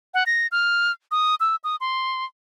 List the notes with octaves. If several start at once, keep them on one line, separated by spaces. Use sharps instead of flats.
F#5
A#6
F6
D#6
E6
D#6
C6